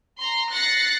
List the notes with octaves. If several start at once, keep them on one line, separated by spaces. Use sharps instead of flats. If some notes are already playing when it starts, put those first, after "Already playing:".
A#5 C6
F#6 A6 A#6 C7 C#7